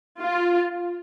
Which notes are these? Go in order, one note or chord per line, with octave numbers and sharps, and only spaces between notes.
F4